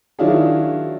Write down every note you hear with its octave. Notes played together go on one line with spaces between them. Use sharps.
D#3 F#3 D4 E4 F4 G#4